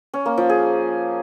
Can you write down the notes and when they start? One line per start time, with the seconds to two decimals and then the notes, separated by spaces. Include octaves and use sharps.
0.14 C#4
0.26 A#3
0.38 F3
0.50 G#4